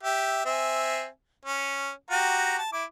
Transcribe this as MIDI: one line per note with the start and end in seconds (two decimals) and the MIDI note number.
0.03 0.45 67
0.03 0.45 76
0.45 1.07 60
0.45 1.07 76
0.45 1.07 80
1.45 1.90 61
2.11 2.58 66
2.11 2.58 67
2.11 2.58 82
2.58 2.71 81
2.73 2.84 64
2.73 2.84 86